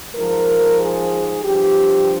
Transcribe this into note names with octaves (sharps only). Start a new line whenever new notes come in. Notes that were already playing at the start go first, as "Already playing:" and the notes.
G#2 F3 A#4
G#4
G2 F3 G4